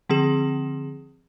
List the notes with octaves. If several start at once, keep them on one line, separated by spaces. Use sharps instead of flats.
D3 F3 C4 G#4 E7